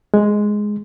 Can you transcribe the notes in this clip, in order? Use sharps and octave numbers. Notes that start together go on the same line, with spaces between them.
G#3